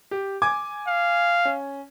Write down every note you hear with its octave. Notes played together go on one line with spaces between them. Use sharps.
G4
G#5 D6 G#6
F5
C#4